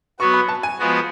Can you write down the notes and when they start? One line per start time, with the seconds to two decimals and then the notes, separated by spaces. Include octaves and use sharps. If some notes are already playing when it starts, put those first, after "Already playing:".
0.19 F#3 B3 F#4 C#6
0.34 B5
0.48 A5
0.63 G#5
0.79 F3 G#3 B3 F#4